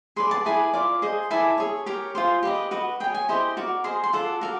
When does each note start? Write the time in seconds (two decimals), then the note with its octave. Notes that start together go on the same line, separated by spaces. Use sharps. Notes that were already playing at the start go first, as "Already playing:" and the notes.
0.16 G#4 B4 D5 C6
0.31 A5
0.45 E4 G#4 B4 D5 G#5
0.74 F4 A#4 D5
1.02 G#4 C5 D#5
1.31 E4 A4 D5 G#5
1.58 G#4 C#5
1.86 G4 A#4 C#5
2.15 F4 G#4 C5
2.43 G4 B4 D#5
2.71 F#4 B4 D#5
3.00 G#4 G5
3.04 C#5
3.15 G#5
3.28 E4 G4 C5 D#5
3.57 F#4 A#4 D5
3.84 G#4 C5 D#5 C6
4.04 C6
4.13 F4 A4 D5 F#5
4.41 F#4 A#4 D5